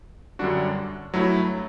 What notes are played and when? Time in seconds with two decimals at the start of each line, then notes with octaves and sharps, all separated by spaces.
0.39 F#2 D3 G3 D4 F#4
1.13 G2 F#3 A3 E4